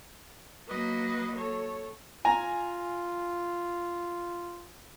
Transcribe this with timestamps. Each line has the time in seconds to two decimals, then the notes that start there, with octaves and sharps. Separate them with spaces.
0.68 F#3 A#3 B4 D#5
1.36 A4 C#5
2.25 F4 G#5 A#5